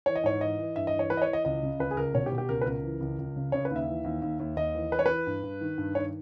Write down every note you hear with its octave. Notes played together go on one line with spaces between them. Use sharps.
E3 C#5
D#5
G#2 C#5
E3 D#5
E3
G2 E5
D#5
E3
C#5
E3 B4
D#5
C#5
E3
D#5
C#2 D#5
C#3
C#2 B4
G#4
C#2 A#4
B2 C#5
G4
B2
G4
C#2 A#4
B4
C#2 A#4
E3
C#2
C#2
C#3
C#3 C#5
B4
D#2
E5
E3
D#2
D#2
D#2
D#2 D#5
E3
E3 B4
C#5
E3 B4
G2
G2
D#3
G2
D#3 C#5